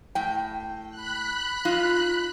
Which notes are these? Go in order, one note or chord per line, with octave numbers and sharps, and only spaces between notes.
A2 G5
B5 F#6
D#4 F4